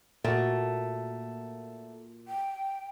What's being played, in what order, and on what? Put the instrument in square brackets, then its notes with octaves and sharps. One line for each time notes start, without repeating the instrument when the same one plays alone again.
[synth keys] A#2 [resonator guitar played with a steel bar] A3 [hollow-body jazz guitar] F#4 A#4
[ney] G5